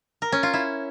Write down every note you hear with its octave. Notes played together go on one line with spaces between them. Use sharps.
A#4
C#4
F4
E4